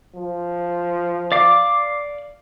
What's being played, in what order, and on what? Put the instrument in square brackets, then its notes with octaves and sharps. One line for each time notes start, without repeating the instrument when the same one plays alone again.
[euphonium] F3
[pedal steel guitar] D5 F5 D6